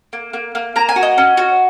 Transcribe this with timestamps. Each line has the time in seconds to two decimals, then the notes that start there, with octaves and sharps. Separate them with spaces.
0.13 A#3
0.33 A#3
0.55 A#3
0.76 A#3 A#5
0.89 G#5
0.96 F#4
1.03 D#5
1.18 C#4
1.37 F#4